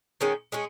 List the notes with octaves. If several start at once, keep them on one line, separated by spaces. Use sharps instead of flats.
D#3 G#3 C#4
G#3 C#4 G#4